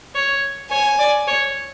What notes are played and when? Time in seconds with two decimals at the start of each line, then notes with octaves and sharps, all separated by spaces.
0.15 C#5
0.71 C#5 G#5
0.99 D5
1.28 C#5